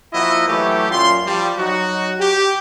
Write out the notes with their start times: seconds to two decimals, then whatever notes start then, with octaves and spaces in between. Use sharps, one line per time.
0.13 F3 A#3 E4 F#4 D#5
0.48 E3 F#3 A3 G4
0.90 F#2 A#2 F4 C6
1.26 F3 G3
1.57 F#3 D#4 F#4
2.20 G4